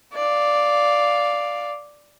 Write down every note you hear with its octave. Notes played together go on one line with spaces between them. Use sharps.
D5 F5